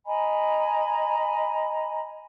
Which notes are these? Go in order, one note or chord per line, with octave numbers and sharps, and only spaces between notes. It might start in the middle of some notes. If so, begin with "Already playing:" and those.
D#5 G#5 A#5 B5